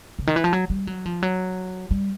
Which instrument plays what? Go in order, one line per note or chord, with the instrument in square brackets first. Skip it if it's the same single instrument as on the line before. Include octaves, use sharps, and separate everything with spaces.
[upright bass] C#3
D#3
E3
F3
F#3
G3
F#3
F3
F#3
G3